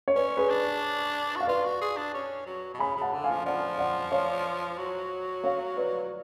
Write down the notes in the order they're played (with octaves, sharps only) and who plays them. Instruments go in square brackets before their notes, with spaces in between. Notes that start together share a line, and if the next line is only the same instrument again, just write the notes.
[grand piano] C#5
[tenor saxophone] C#4 [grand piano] B4 D5
[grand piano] G#4 B4
[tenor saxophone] D4
[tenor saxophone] F#4 [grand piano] F5
[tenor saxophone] F4 [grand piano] B4 D5
[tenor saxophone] F#4
G#4
D4
C#4
F#3
B2
[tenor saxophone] C#3 [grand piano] G#5 B5
[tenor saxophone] C#3
[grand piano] F#5 A5
[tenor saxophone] D3
[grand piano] F5 G#5
[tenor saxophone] F3
[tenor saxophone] F3 [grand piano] D5 F#5
[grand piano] D5 F#5
C#5 F5
[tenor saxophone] F#3
[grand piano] C#5 F5
B4 D5